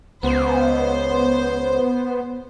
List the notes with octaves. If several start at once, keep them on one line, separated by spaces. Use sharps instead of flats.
C#2 B3 C5